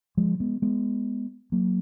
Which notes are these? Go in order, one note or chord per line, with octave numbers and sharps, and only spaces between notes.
F3 G#3
G#3 B3
G#3 B3
F#3 A#3